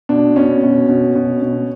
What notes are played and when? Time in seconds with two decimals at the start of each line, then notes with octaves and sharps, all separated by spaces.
0.09 B2 D4
0.36 B2 C#4
0.63 B2
0.89 B2
1.15 B2
1.42 B2